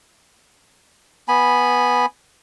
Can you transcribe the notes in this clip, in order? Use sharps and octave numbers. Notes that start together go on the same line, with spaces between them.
B3 G#5 B5